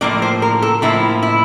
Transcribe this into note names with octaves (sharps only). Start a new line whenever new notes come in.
A2 F3 A#3 D5
C5
A#4
A4
A2 F3 A#3 E4
E4